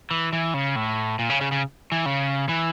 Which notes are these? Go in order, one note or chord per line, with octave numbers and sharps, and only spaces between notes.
E3
E3
C#3
A2
A#2
C#3
C#3
C#3
E3
C#3
E3